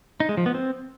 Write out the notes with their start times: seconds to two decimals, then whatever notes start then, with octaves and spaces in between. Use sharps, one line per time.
0.20 D#4
0.29 G#3
0.37 F3
0.46 B3
0.54 C4